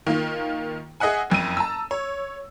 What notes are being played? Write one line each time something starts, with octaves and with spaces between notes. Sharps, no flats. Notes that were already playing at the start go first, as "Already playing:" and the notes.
D#3 A#3 F4
G#4 D#5 E5 F#5 G#5
F#1 F2 E6 D#7
A5 A#5 E6
C#5